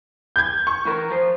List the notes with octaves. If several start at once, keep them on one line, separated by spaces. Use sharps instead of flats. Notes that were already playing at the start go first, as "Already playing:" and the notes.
G6 G#6
C#6
E3 A#4
F3 C5